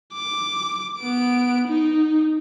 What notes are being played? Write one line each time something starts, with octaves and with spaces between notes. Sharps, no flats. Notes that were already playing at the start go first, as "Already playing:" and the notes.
D6
B3 D7
D#4